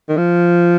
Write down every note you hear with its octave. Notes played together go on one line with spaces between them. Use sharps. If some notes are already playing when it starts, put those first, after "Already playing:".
D#3
F3